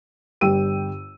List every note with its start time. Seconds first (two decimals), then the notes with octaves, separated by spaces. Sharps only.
0.41 G1 G3 G4 G5 E6 D#7